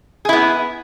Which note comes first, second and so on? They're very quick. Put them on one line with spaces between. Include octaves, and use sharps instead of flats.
G#4 E4 B3